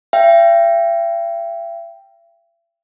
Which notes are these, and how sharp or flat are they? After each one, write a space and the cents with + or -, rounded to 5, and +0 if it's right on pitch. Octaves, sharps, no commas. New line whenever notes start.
E5 +40 G5 +0